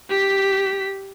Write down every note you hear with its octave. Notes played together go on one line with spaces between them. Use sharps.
G4 B6